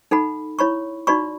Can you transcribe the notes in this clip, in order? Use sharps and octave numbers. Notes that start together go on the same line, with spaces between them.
D#4 A4 F#5 B5
E4 C#5 B5 C#6
D#4 F#4 D5 B5 C#6